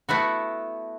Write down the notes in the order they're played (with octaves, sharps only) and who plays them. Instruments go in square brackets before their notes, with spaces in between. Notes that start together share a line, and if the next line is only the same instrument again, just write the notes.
[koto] A3 B3 E4 F#4